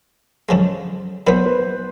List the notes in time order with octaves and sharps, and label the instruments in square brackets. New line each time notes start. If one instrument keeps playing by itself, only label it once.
[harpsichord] F#2 D3 F3 G#3
[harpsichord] A#2 F#3 B3 [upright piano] C5
[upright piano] B4